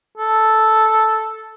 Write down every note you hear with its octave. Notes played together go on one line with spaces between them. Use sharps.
A4